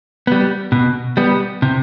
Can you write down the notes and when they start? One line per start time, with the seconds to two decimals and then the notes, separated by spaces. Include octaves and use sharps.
0.27 G3 B3
0.72 B2
1.17 G3 B3
1.62 C3